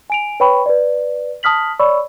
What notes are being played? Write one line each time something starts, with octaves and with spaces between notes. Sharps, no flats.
G#5 D7 F7
B4 C#5 G5 B5 C#6
B4 D5
A5 D#6 F6 B6 F#7
C#5 D5 B5 C#6 E6